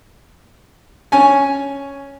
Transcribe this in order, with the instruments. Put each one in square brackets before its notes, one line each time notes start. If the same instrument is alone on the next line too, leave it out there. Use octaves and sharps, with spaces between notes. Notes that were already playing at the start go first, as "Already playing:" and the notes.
[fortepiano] C#4 G#5